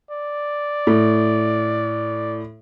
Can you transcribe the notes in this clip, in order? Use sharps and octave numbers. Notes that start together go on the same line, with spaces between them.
D5
A2